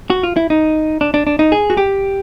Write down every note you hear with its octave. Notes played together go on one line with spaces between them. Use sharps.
F#4
F4
E4
D#4
D4
D4
D4
D#4
G#4
F#4
G4